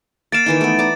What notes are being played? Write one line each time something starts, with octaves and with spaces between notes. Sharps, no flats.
A#3 F5 A6 D7 E7
D#3 E3 D#4
A3 B3
D5 A#5